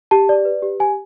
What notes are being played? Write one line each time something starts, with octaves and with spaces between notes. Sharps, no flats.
G4 A5
D5
B4
G4
G4 G#5